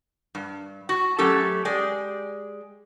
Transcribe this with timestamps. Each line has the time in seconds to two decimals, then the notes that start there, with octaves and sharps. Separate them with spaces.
0.35 G2
0.89 F#4
1.18 F#3 A3 C#4 G4 A4
1.65 G#3 G4 G#4 D5